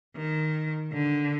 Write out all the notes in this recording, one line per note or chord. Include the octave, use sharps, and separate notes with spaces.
D#3
D3